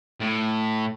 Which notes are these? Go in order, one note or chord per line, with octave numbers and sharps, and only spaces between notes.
A2